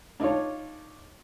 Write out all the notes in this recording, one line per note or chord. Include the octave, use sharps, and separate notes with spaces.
D4 D#4 F4 C#5